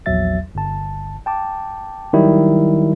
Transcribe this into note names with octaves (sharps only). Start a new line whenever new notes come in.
A#1 E2 F#3 E5 A6
G1 A5
G5 A5 D6
D#3 F#3 G3 E4